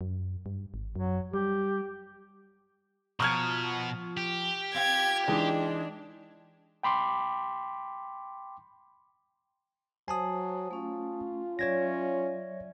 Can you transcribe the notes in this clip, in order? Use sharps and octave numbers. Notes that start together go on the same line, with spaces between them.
F#2
G2
G#1
F#2 F#3
G3 G4
B2 F3 A#5 C#6 F6 G#6
G4
C4 F4 G5 G#6
E3 G#3 D4 D#4
G5 B5 C6 D6
F#3 C5 F#5 G#5 A5 D#6
A3 C#4 F4
F#3 C#4 C#5 D5 E5 G#6 A#6